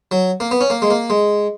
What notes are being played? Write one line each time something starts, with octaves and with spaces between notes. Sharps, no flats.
F#3
A#3
B3
C#4
A#3
G#3
A#3
G#3